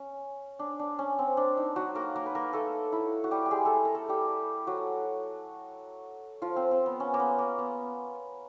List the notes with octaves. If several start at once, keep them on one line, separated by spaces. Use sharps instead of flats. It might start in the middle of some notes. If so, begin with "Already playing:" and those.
Already playing: C#4
D4
D4
C#4
C4
D4
D#4
F#3 F#4
A#3 A#4
A#3 A#4
B4
A#3 A#4
A3 A4
E4
F#4
G3 G4
G4
G#3 G#4
A3 A4
A#4
A3 A4
G3 G4
F#3 F#4
F3 F4
C4
C4
B3
C#4
A#3
B3
A#3
B3